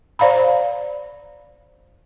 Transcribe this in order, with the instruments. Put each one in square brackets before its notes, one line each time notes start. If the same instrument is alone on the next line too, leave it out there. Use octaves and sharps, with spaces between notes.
[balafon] C5 D5 F5 A#5 B5